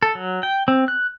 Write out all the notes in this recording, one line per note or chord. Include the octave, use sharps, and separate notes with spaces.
A4
F#3
G5
C4
F#6